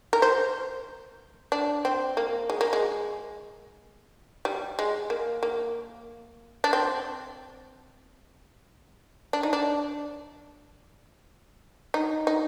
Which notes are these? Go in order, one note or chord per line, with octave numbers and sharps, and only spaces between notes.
A#4
C5
D4
C4
A#3
G#3
A#3
G#3
G3
G#3
A#3
A#3
D4
C4
D4
D#4
D4
D#4
D#4